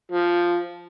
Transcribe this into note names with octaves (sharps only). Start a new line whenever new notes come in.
F3